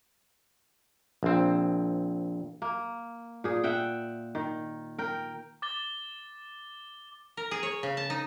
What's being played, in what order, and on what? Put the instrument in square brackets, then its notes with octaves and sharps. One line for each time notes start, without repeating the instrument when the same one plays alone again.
[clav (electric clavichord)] A#1 C4
[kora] A#3
A#2 G#4
E5 F#5 G5
D#3
A#4 G5
[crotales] D6 A6 G7
[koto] A#4
G#4
C#5
C#3
A5
D#4